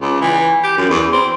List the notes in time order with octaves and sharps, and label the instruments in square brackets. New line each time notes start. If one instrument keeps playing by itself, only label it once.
[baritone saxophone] C#2
E3
G4
F#2
E2
C4